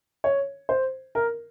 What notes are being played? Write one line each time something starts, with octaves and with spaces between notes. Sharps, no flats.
C#5
C5
A#4